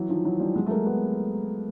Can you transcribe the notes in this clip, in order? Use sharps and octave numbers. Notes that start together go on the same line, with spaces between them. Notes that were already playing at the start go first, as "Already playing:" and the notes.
Already playing: E3 F#3
D#3 F3
E3 F#3
F3 G3
F#3 G#3
A3
G#3 A#3
A3 B3